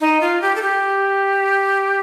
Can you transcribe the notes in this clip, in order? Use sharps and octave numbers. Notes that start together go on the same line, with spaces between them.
D#4
F4
G4
A4
G4